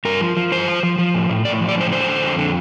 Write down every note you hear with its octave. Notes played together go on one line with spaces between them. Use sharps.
G2 A#4
F3
F3
G2 C5
F3
F3
F3
A2
A2
A2 D5
F3
D5
A2 C5
D3 C5
D3
F2
D3